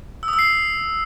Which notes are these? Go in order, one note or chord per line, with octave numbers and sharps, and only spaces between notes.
E6
D#6
E6
C7